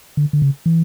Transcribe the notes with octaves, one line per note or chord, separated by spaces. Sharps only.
D3
D3
C#3
E3